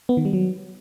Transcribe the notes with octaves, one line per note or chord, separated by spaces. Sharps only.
B3
D#3
G3
F#3